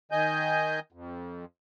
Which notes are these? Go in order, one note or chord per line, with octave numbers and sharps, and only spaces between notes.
D#3 D#5 G#5 G6
F2